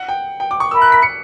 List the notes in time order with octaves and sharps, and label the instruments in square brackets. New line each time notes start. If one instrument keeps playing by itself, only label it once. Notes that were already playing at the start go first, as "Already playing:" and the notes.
Already playing: [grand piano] F#5
G5
G5
D6
C#6
[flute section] A#4 E5 B5 [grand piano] E6
[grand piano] F#6
B6
C#7